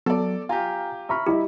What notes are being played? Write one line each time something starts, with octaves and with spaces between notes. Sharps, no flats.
F#3 B3 A4 D5
F4 G4 F5 G#5 A#5
E5 A#5 B5 C#6 F6
G3 E4 G4 D#5